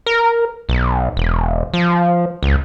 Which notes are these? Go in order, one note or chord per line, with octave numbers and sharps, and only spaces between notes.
A#4
B1
E1
F3
C#2